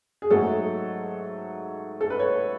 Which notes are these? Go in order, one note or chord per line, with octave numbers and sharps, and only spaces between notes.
G#4
G#2 F#3 A3 A4
A4
B4
C#5